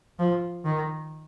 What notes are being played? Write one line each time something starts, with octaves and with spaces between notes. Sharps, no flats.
F3
D#3